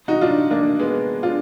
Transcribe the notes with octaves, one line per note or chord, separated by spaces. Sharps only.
D#4 F#4
D4 F4
A#3 D4
G#3 B3
D4 F4